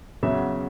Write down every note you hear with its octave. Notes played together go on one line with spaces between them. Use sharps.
E2 C#3 F#3 E5